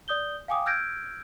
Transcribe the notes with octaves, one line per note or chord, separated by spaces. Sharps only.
D5 D#6 G6 G7
F5 G5 G#5 D6 D#6
E6 F6 G6 G#6 A#6 D7